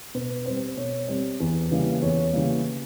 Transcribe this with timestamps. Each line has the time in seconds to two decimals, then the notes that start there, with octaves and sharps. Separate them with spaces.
0.14 B2 B4
0.45 G3 C4 C5
0.77 B2 C#5
1.08 G3 C4
1.40 E2
1.71 C#3 E3 G3 A#3
2.02 E2 C#5
2.33 C#3 E3 G3 A#3